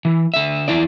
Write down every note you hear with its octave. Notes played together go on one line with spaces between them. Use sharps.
E3
D3 E5
E2 E4 D5